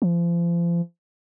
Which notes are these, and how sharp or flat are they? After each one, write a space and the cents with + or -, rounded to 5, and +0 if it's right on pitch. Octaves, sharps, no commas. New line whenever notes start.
F3 -35